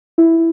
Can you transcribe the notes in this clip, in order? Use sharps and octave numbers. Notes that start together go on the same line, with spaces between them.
E4